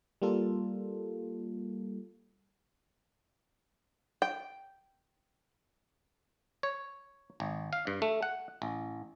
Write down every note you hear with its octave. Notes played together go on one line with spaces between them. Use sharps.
G3 A#3 F4 A4
G5
C#5
G#1
F5
G2
A3
F#5
A1